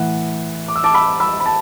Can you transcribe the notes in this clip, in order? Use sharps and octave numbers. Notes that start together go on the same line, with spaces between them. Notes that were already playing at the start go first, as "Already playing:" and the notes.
Already playing: A2 E3 F#5
D6
E6
A5 D6
B5 E6
B5 E6
B5
A5